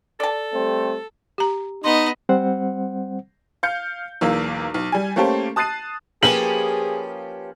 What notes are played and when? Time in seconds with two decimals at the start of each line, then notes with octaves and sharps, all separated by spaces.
0.20 A4 D5 A5
0.53 G3 A3 C4
1.38 G4 A#5
1.84 B3 D#4 D#5 C6
2.29 G3 C4 C5 F#5
3.63 F5 F6 G6 C#7
4.21 B1 E2 A#3 E6
4.74 B1
4.92 G3 G#5
5.16 A3 A#3 C#4 G4 A4 C5
5.56 A5 D#6 F#6 A6 C7 D#7
6.23 F3 A#3 C#4 G4 G#4 B4 F#7